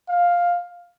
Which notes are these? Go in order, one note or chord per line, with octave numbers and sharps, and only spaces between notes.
F5